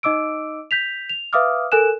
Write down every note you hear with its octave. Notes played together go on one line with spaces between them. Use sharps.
D#4 D#5 D6 E6 D7
G6 B6 F7
F7
B4 E5 F5 D6 D#6 F6
A4 A#4 G#5 F#6 E7